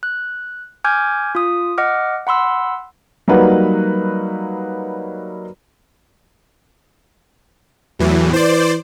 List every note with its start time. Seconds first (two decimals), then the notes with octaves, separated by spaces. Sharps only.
0.03 F#6
0.84 G#5 D6 F6 G6 G#6
1.35 F4 D#6
1.78 D#5 F#5 D6 F6
2.27 F#5 B5 C6 E6
3.28 F#3 G3 A#3 D#4 B4 F#5
7.99 E2 A2 E3 F#3
8.33 E3 C5 D5